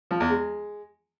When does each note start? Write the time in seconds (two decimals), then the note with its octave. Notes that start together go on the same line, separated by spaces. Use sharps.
0.11 F3
0.20 E2
0.30 G#3